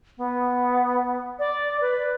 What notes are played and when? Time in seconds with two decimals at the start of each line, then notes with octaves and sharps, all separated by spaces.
0.17 B3
1.39 D5
1.81 B4